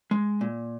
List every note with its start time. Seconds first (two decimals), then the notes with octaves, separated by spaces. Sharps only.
0.11 G#3
0.41 A#2